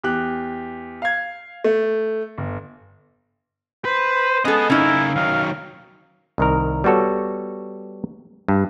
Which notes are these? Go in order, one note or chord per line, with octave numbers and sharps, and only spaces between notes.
E2 G4 F#6
F5 G#6
A3
G1
B4 C5
B3 C#4 G#4 A4 D#5
C#3 C#4 D#4 E4 A#4
D#3 F#3 F5
C2 D#3 A#4
G3 B3 F#4 A4 C#5
G2